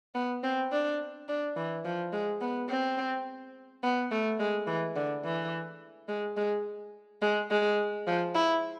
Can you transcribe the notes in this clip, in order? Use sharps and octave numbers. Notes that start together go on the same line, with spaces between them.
B3
C4
D4
D4
E3
F3
G#3
B3
C4
B3
A3
G#3
E3
D3
E3
G#3
G#3
G#3
G#3
F3
E4